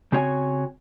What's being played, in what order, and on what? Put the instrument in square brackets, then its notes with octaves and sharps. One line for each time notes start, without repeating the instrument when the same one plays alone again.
[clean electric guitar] C#3 C4 F#4 C#5 D5 G#5